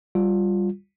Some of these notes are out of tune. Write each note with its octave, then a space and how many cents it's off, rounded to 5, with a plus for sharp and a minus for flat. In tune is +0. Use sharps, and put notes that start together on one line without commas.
G3 +0 F4 +10